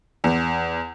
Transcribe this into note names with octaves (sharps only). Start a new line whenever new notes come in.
E2